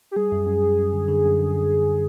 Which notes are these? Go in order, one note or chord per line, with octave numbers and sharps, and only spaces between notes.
G4
G3 G#4
F#2
F#2
F#2
F#2
D3
D3
F#2
D3
F#2
F#2